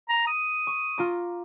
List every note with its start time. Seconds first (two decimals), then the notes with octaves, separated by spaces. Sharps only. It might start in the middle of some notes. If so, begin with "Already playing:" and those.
0.09 A#5
0.27 D#6
0.67 C#6
0.98 F4 A#5 D6